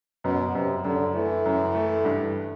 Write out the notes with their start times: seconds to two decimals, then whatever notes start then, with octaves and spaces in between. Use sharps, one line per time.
0.24 F#2 B2
0.55 F#2 C3
0.85 F#2 D3
1.15 E3 A3
1.46 F#2
1.75 A3
2.05 G2